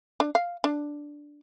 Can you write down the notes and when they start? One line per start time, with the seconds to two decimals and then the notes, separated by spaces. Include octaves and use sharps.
0.20 D4
0.35 F5
0.64 D4